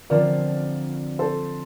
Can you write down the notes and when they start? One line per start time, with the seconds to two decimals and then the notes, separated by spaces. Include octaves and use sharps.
0.10 D3 F3 C4 F4 A#4 D5
1.19 A4 C5